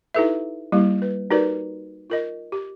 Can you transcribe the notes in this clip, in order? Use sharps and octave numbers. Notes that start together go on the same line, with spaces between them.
D#4 E4 G4 A4 B4 E5
G3 A#3 E4 G4
B4
D#4 F#4 G4 A#4 B4 D5
F4 A#4 D#5
G4